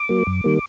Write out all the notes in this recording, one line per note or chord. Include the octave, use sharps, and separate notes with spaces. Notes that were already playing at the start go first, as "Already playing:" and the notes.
Already playing: D6
F#3 A#3
F#2
D#3 G3 A#3